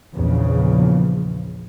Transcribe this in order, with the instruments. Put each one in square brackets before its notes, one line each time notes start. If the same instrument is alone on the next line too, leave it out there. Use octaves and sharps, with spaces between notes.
[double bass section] A#1 E2 C#3 F3